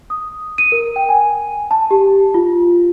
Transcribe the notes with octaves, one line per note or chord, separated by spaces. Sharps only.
D#6
D#7
A#4
G5
G#5
A5
G4
F4